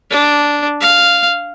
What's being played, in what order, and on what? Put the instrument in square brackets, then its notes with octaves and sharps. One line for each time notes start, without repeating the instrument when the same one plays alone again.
[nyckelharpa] D4
F5